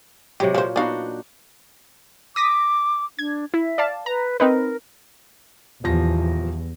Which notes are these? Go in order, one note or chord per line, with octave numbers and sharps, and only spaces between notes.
C3 F#3 G#3 G4
A#2 F3 C5
B3 D4 D#4 F#4 F5
D6 D#6 A#6 B6
D4 G#6
E4 E5
D5 F5 A5
B4 A#5
C4 D#4 A#4 B4
D#1 E2 F3 A#6